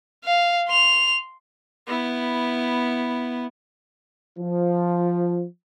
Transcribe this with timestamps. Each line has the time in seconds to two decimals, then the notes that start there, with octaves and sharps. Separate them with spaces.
0.25 F5
0.68 C6 F7
1.87 B3 E4
4.38 F3